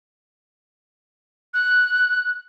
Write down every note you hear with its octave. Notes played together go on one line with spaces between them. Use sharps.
F#6